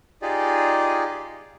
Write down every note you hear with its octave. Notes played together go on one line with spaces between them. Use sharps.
D#4 F4 G4 G#4 D5 D#5